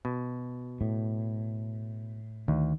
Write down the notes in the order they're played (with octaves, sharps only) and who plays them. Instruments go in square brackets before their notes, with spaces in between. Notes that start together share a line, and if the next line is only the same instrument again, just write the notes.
[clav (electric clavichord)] B2
[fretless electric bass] A2
[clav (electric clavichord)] D2 [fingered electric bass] D#3